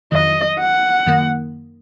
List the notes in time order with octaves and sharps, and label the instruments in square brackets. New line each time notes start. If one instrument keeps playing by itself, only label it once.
[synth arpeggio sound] F2 D#3 F#3 [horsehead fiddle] D#5
[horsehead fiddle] F#5
[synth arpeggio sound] F#2 D#3 A#3